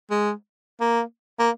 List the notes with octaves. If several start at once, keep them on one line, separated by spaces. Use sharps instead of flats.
G#3
A#3
A#3